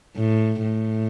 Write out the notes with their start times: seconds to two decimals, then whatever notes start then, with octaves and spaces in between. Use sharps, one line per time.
0.16 A2
0.62 A2